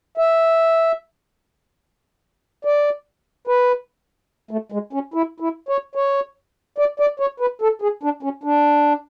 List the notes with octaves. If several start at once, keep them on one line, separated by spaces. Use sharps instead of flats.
E5
D5
B4
A3
G#3
C#4
E4
E4
C#5
C#5
D5
D5
C#5
B4
A4
G#4
D4
C#4
D4